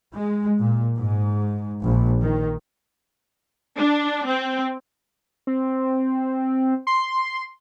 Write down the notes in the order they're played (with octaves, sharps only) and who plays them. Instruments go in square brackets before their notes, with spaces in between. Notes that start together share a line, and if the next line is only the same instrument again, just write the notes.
[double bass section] G#3
A#2
G#2
A#1
D#3
[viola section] D4
C4
[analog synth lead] C4
C6